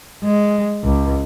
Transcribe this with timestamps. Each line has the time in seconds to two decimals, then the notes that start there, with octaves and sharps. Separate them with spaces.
0.24 G#3
0.84 C#2